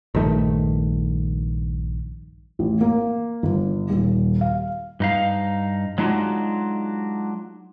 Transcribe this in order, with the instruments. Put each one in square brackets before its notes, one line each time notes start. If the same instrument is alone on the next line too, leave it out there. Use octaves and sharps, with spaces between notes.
[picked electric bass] A#1 G2 D#3 A3
[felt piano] A1
A#3
G1
D#1
F5
[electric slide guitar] G2 D#4 F5
F#3 G#3 D4 D#4 F4 F#4